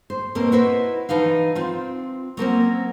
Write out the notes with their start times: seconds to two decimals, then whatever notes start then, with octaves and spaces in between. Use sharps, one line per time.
0.10 C5
0.35 B2 A#3 C4
0.52 E4 F#4 B4 C5 D#5 E5
1.09 E3 F3 D#4 F5
1.55 C4 F4
2.37 F#3 A#3 C4 C#4